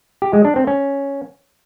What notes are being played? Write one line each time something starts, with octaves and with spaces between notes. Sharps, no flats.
G4
G#3
D4
C4
C#4